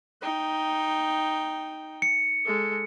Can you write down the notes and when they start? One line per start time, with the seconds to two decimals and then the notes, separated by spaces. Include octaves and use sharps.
0.22 D#4 G5
2.02 C#7
2.45 G#3 A4